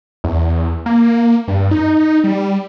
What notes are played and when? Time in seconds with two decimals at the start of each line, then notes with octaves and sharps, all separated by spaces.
0.24 E2
0.86 A#3
1.48 G2
1.71 D#4
2.24 G3